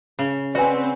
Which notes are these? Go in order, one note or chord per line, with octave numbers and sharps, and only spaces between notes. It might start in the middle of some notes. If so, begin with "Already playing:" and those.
C#3
C4 F#4 B4 D5 G#5